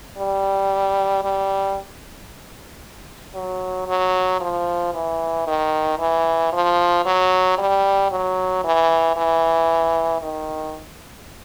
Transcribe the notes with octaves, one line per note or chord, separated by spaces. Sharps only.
G3
G3
F#3
F#3
F3
E3
D#3
E3
F3
F#3
G3
F#3
E3
E3
D#3